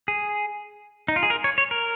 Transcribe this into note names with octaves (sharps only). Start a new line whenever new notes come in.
G#4
D#4
F4
G#4
A#4
C#5
C#5
A#4